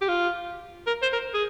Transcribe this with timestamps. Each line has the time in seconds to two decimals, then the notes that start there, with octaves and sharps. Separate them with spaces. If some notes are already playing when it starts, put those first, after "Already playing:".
0.01 G4
0.09 F4
0.87 A#4
1.02 C5
1.13 A#4
1.34 G#4